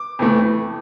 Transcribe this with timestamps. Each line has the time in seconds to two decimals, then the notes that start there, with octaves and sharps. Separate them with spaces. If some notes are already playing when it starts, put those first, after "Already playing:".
Already playing: D6
0.19 F2 E3 A3